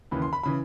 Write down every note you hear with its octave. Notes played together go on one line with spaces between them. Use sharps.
D#2 C#3 E3 B5
C6
B5
C#3 E3 B5